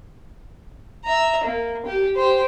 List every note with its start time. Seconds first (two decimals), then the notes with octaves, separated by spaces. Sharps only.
1.05 E5 A#5
1.44 A#3
1.86 G4
2.16 G4 C5